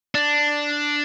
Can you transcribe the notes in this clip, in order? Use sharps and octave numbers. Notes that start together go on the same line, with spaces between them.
D4